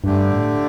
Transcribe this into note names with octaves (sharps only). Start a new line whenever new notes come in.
G2 D3 A3 D4 G4
A2